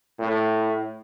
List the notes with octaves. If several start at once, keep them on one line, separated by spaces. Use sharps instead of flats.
A2